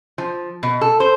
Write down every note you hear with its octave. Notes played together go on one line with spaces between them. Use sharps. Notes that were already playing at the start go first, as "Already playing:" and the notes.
F3
B2
A4
C5